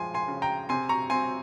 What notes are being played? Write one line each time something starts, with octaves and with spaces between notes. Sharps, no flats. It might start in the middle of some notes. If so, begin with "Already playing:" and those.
Already playing: F3 G#3 G#5 C6
G#5 C6
C#3
G5 A#5
C3 G#5 C6
A#5 C#6
C4 G#5 C6